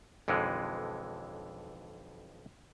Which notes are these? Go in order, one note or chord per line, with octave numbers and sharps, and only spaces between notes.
B1 F2 D3 E3 G#3